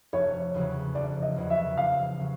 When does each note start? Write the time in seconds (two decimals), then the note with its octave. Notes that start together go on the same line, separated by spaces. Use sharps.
0.13 F1 C#5
0.54 E2 C#3 F#3
0.95 F1 D5
1.22 D#5
1.36 E2 C#3 F#3
1.50 E5
1.77 F1 F5
2.20 C#3 F#3